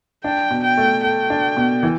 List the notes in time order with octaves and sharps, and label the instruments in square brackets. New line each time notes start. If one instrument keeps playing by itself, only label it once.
[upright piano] D4 [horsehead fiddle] G5
[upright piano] B2
[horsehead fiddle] G5
[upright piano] A3
[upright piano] A4 [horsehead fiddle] G5
[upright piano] D4
B2
E3